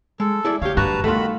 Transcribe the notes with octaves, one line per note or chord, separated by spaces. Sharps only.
G#3 A4
E4 G#4 D5
D2 D4 G4 C#5 F5
G2 F#4 B4 A5 A#5
D#3 G3 A3 B3 F4 F#4 B5